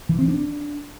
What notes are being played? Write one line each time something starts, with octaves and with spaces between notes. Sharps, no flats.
E3
C4
D4